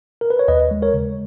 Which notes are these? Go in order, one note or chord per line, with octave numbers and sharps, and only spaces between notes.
A#4
B4
C#5
D#2 B4 D#5
G#3
A#4 C#5
C#3